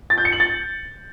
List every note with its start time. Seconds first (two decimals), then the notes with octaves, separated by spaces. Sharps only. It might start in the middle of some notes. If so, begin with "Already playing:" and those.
0.10 A6
0.18 G6
0.25 C#7
0.33 F#7
0.40 A6